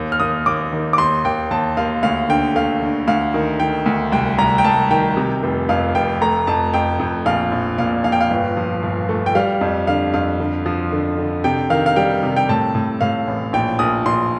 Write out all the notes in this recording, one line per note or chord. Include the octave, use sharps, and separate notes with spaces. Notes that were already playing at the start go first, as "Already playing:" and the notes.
Already playing: D#2
F6
D#2 D#6
D#2 D6
D#3
D6
D#2 C6
D#2 G5
D#2 A5
D#2 F5
D2 F5
D3 G5
A3 F5
D3
D2 F5
D#3
D#3 G5
D2
C2 G5
C2 A#5
G5
C2 A5
D#3 G5
C3
F1
F2 F5
F1 G5
A3 A#5
F2 A5
F2 G5
F2
A#1 F5
A#1
A#2 F5
A#1 F5
G5
F5
G1
F3
G1
A3
G5
G3 F5
F2
D3 F5
F2 F5
D3
F3
D3
D3
C3 G5
D#3 F5
F5
G3 G5
C3
G5
A2 A5
A2
A2 F5
A1
A#1 G5
A#1 D#6
A#1 C6